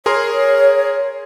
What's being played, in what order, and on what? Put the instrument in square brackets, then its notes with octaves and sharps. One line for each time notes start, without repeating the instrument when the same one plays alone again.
[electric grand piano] G#4 A#4 C6 [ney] C#5